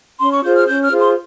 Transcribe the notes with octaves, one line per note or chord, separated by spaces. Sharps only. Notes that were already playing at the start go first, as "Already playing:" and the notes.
C#4 C6
C#6
F4 G#4 C5 G6
F6
C#4 G6
F6
F4 G#4 C5
C6